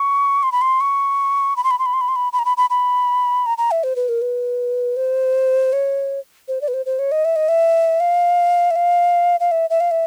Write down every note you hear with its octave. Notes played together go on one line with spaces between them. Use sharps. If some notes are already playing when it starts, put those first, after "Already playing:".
Already playing: C#6
C6
B5
C6
C#6
B5
C6
B5
C6
B5
C6
B5
C6
B5
B5
A#5
B5
B5
B5
A#5
A#5
E5
C5
B4
A#4
B4
C5
C#5
C5
D5
B4
C5
C5
C#5
D#5
E5
D#5
E5
F5
E5
F5
F5
E5
E5
F5
E5